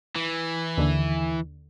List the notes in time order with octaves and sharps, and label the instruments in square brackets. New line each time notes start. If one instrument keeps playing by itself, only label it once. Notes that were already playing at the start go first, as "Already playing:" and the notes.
[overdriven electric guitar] E3
[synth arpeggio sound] D#2 D3